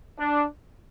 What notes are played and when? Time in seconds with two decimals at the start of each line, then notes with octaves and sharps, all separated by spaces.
0.18 D4